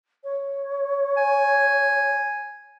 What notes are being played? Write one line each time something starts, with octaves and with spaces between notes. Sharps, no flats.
C#5
G#5